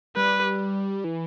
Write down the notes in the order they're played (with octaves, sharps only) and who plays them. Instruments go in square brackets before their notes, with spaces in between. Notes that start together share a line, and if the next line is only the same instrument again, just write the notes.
[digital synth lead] G3 [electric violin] B4
[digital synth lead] E3